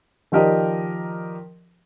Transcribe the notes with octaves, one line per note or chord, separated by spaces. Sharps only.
D#3 F3 G4 A#4 D5 D#5